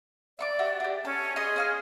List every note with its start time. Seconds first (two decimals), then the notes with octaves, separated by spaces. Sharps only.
0.39 D5 E5 C#6 D6
0.59 F#4 G4 E5
0.80 D4 G4
1.05 C#4 A4
1.36 G#4 D#5 C6 D#6
1.56 C#4 F5 F6